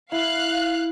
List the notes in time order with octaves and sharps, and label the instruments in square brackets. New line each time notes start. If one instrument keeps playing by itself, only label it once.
[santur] E4 [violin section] F5 F#6